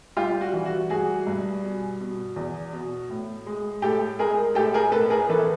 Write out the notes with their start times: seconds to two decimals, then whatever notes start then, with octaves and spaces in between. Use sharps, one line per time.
0.17 G3 F4 G4
0.41 F#4
0.53 E3
0.65 F#4
0.90 G2 F#4 G#4
1.27 G2
1.64 B2
2.00 B2
2.36 E2
2.73 B2
3.10 A2
3.46 G#3
3.82 A2 G4 A4
4.19 G#3 G#4 A#4
4.55 A2 G4 A4
4.74 G#4 A#4
4.92 A2 A4 B4
5.10 G#4 A#4
5.29 E3 A4 B4